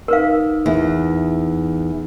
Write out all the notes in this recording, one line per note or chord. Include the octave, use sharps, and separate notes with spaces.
D#4 A#4 B4 F5
E2